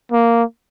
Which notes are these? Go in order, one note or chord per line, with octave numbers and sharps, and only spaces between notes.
A#3